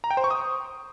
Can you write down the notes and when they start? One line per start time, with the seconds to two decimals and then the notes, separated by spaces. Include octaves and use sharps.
0.04 A#5
0.11 G5
0.17 C5
0.24 C#6
0.31 D#6